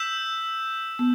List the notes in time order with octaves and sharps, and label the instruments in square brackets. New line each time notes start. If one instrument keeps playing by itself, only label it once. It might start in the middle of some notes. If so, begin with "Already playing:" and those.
Already playing: [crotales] E6 G6 B6 E7
[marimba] B3